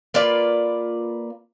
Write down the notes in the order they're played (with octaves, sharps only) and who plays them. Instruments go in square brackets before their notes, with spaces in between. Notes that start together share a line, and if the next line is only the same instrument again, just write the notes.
[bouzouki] A#3 F4 B4 D5